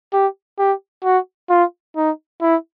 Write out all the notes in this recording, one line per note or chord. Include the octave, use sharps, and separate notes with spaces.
G4
G4
F#4
F4
D#4
E4